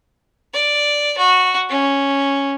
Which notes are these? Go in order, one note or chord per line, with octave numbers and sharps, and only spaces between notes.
D5
F#4
C#4